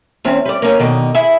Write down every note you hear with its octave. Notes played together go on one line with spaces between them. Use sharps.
E2 C4 C#4
G3 D5
A#3 C#4
B2 D3 D#3
E4 G#4